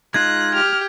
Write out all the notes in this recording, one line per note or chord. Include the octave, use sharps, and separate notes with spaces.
G#3 D#4 F4 F#6 G#6
G4 F6